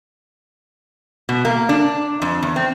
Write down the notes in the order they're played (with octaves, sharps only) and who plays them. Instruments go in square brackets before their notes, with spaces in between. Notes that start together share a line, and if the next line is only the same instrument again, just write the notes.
[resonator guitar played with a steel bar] B2
A#3
D4
F2
E2
C4